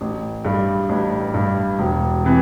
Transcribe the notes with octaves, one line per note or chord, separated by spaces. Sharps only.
A1
G2 G3
A1
G2 G3
E1
C3 E3